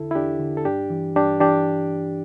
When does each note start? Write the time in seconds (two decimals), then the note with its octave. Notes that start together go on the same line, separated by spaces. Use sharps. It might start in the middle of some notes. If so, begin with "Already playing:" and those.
Already playing: E2 D3 E4 A4
0.11 E4
0.15 E2 D4 G4
0.40 D3
0.57 A4
0.65 G2 D4 G4
0.90 E3
1.15 G2 D4 G4
1.40 E3 D4 G4